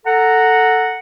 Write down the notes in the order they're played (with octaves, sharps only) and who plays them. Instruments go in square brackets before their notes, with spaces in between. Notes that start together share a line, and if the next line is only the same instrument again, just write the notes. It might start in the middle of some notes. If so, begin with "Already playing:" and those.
[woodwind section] A4 F#5 A#5